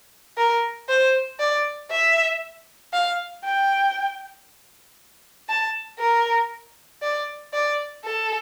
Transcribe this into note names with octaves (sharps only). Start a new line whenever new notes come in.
A#4
C5
D5
E5
F5
G5
A5
A#4
D5
D5
A4